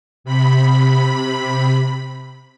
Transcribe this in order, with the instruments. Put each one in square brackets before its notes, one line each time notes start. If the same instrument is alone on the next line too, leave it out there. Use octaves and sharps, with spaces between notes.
[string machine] C3 B5